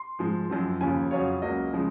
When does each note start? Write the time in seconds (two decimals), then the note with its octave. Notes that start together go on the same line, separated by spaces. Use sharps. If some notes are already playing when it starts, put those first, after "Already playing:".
Already playing: C6
0.19 G#2 F3 G#3
0.50 F#2 F3 C4
0.81 D#2 C#3 F3 G#5
1.11 F2 C#3 F#3 C#4 F4 C#5
1.42 C#2 C#3 F#3 A#3 D#5
1.73 C#3 F3 G#3